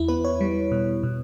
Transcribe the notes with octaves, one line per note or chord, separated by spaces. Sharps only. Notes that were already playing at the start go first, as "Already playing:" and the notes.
Already playing: E2 E4
B3 B4
C#5
G3
B2
B2